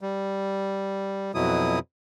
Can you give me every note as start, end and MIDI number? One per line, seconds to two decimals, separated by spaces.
0.01 1.32 55
1.35 1.79 41
1.35 1.79 47
1.35 1.79 54
1.35 1.79 64
1.35 1.79 87